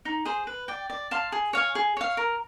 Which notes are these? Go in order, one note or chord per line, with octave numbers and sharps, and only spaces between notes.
D#4
G#4 C5
B4
D5 G5
D5
F5 A5 C6
G#4
C#5 F5 G#5
G#4
C#5 F5
A#4